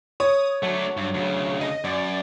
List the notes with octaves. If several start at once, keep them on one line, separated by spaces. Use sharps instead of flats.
C#5 D#6
F#3 A3 D4
G2
D2 C#3
D#5
F#2 D5